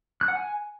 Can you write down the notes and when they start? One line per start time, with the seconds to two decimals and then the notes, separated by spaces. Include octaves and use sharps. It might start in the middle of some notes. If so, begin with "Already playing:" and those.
0.21 F#6
0.28 F#5
0.35 G#5